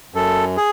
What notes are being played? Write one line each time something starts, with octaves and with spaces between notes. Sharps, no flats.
F#2 A4
G#4